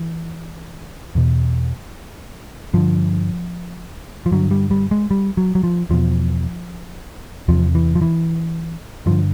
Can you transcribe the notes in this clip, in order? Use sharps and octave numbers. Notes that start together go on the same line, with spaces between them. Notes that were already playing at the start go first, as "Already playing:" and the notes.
Already playing: E3
E2 B2
G2 D3 F3
F3
G2 D3 F#3
G3
G3
G#3
G3
F#3
F#3
F3
E2 B2 F3
E2 C3 F3
E3
F3
E3
G2 D3 F3